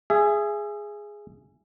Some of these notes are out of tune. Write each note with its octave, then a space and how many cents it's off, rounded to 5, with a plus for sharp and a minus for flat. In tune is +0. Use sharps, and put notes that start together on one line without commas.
G#4 +0 E5 +30